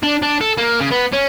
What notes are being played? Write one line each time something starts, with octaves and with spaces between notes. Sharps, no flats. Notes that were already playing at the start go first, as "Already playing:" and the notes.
D4
D4
A4
A#3
C#3
B3
C#4